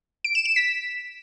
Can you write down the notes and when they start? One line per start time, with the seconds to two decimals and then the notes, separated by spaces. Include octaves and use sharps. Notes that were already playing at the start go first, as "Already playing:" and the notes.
0.24 D7
0.35 E7
0.46 E7
0.56 B6